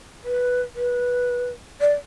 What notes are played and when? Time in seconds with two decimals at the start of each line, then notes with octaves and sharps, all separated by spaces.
0.24 B4
0.75 B4
1.81 D5